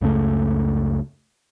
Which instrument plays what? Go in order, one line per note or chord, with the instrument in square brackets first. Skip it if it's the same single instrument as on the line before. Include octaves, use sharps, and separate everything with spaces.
[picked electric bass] C#2 F#2 C#3 A3